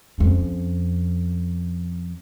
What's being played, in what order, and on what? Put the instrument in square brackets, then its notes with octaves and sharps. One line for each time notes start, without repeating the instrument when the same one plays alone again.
[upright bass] F2 C#4